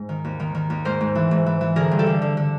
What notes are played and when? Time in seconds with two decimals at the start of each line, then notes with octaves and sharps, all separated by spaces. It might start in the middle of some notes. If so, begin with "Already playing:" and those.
Already playing: G#2 C5
0.09 D#3
0.24 D#2
0.40 D#3
0.55 D#3
0.70 D#2
0.85 G#2 A#4 C5
1.01 G#2
1.15 E3
1.31 G#2
1.46 E3
1.61 E3
1.76 D3 G#4 A#4
1.91 G2
1.99 G4 A4
2.07 D3
2.22 D3
2.37 D3